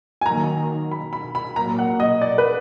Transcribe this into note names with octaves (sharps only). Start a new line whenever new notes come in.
G#5
D#3 F#3 A#3 A#5
B5
B5
B5
A#2 F#3 A#3 A#5
F#5
D#5
D5
B4